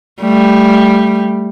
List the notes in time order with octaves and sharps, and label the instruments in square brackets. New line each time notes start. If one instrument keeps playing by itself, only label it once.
[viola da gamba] G3 A3